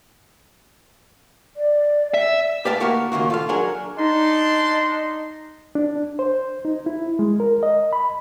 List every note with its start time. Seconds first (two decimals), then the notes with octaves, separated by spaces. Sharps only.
1.56 D5
2.14 E5
2.65 G4 B4 D5 F5 G5 A5
2.80 D2 A#3 F#4 G4 A#4
3.12 C#2 D#3 A#3 F#4
3.30 F4 A4 F5
3.49 F#3 D4 G#4 A#4 F#5
3.98 D4 D#4 A5 C6
5.75 D4
6.19 C5
6.65 D#4
6.86 E4
7.19 G#3
7.40 A#4
7.63 D#5
7.93 B5